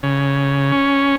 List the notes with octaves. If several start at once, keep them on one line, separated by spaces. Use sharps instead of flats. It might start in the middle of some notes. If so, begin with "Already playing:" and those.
C#3
C#4